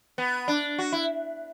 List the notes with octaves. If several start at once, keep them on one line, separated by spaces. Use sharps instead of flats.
B3
D4
F#4
E4